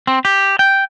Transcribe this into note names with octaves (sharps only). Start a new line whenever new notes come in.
C4
G4
G5